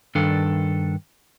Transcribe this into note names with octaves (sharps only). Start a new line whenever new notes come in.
G2 D#3 D4 A4